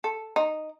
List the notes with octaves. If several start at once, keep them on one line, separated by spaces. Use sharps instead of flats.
A4
D#4